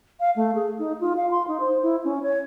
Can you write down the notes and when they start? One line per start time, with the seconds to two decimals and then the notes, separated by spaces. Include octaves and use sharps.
0.20 F5
0.36 A3
0.55 G#4
0.79 D#4
1.00 F4
1.17 F5
1.31 C6
1.48 D#4
1.60 C5
1.82 E4
2.04 C#4
2.23 C#5